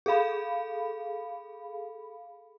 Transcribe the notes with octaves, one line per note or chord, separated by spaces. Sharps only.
G#4 A4 F5 B5